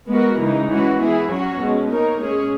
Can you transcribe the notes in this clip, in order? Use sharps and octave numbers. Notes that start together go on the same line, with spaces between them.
G#3 B3 F#4 A#4
C#3 E3 G#3 D#4
E3 G#3 C#4 F#4 B4
E3 B3 E4 G#4
F#3 C#4 F#4 C#5
B2 G#3 C#4
A#3 D#4 A#4 C#5
A#2 G#3 C#4 G#4 C#5